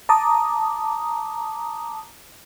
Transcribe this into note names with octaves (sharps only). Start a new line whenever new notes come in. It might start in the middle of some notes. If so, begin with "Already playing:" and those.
A5 A#5 D6 D#6